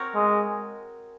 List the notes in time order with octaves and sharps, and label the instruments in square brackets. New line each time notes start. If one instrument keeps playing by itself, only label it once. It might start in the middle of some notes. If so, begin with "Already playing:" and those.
Already playing: [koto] C4 F#4 A#4 C#5
[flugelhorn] G#3